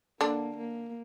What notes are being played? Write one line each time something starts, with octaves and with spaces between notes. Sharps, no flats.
D3 A#3 D4
A#3